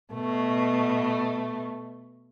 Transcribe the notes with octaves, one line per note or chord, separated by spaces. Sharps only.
B2 A3